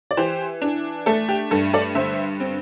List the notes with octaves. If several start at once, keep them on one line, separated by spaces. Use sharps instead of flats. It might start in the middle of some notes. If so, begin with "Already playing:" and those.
D5
E3 G4 C5
D4
A3 A4
G4
G2 A4
A4 D5
D3 C5 E5
C4